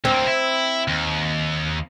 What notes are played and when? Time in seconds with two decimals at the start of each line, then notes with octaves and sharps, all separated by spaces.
0.05 D2 A#3 C4
0.27 E4
0.88 D#2